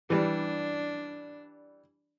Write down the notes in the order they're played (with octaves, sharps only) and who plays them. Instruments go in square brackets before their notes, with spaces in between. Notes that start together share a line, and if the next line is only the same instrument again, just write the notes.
[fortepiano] E3 G3 [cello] D4